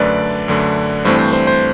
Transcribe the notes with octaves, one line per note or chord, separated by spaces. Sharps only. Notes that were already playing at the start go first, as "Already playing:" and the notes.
Already playing: F#2 D3 A3 B4 D5
F#2 D3 A3
G2 E3 A3 C4 C5
C5
C5
C5